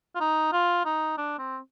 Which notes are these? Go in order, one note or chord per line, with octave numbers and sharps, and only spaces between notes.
F4
D#4
F4
D#4
D4
C4